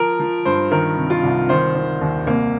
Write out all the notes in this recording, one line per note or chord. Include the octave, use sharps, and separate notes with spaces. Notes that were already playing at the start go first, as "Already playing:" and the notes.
Already playing: F3 A#4
F3
G2 C5
D#3 A#4
C3
F4
C2
D#3 C5
D#3
D#2
C2 A#3